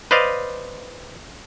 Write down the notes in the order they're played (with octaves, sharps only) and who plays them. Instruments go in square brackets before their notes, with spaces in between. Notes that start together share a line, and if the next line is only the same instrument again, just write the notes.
[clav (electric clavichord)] B4 C5 D5 D#5 F5